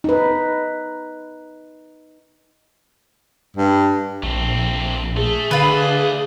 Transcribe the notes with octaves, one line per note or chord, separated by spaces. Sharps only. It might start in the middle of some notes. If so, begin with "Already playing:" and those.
D#4 B4
G2
A#1 A3 C4
A3 G#4
D3 A3 D4 F4 B4